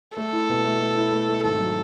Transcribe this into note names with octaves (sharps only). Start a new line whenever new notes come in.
A3 A4
E4
B2
A3
A3
E4
A3
A3
G#1 A4
F#3